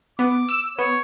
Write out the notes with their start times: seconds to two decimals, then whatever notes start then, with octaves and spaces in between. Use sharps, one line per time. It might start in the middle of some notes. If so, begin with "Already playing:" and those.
0.19 B3 D6
0.49 E6 E7
0.79 B3 C#5